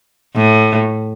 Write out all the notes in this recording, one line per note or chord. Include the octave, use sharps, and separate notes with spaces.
A2